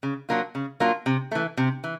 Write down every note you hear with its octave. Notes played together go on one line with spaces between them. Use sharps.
C#3
F#3 A#3 D4 F4
C#3
F#3 A#3 D4 F4
C3
E3 A3
C3
E3